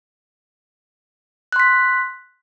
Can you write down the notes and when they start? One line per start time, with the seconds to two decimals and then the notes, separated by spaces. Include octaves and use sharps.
1.52 F#6
1.56 C6
1.60 B6